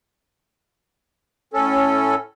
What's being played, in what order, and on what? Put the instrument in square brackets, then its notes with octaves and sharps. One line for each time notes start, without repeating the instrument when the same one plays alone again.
[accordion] A2 C#4 A4